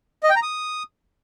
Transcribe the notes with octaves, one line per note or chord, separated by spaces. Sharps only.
D#5
G5
A#5
D#6